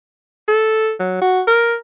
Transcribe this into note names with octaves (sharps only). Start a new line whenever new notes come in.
A4
F#3
F#4
A#4